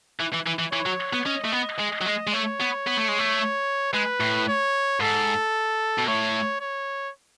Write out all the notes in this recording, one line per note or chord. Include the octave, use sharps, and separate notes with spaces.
E3
E3
E3
E3
E3 C#5
F#3
B3
C#4 D#5
A3
B3
G#3
F#3
G#3
G#3
A3 C#5
B3
B3
A3
G#3
A3
G#3 B4
A2
C#5
G#2 A4
B2
A2 C#5
C#5